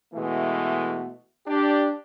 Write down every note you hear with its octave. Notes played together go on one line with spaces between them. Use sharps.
B2 E3 G#3 A3
D4 G4